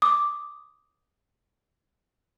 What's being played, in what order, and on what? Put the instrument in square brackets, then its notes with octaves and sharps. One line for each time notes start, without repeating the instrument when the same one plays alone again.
[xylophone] D6 D#6